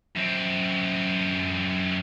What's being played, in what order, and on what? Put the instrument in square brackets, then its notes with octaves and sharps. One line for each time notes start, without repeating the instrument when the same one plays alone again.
[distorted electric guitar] F#2 C4